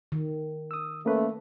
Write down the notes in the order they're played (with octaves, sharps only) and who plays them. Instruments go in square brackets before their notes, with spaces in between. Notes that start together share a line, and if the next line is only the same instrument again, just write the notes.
[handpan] D#3
[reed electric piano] D#6 E6
[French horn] A3 [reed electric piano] A#3 C#4 B4